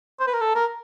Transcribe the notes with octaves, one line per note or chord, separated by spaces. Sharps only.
C5
B4
A#4
A4
A#4